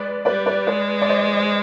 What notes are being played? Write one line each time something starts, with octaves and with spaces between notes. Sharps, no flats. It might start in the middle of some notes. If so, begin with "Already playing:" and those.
Already playing: G#3 B4 D5
G3 B4 D5
B4 D5
G#3 B4 D5
D5
C5 D#5